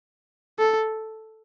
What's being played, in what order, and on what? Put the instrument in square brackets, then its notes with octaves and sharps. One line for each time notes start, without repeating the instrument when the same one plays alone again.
[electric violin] A4